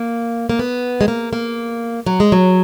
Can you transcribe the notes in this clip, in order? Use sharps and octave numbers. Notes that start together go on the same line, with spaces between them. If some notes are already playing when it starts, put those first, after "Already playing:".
Already playing: A#3
A#3
B3
G#3
A#3
A#3
F#3
G#3
F#3